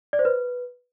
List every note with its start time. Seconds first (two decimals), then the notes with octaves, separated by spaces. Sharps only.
0.13 D5
0.19 C5
0.25 B4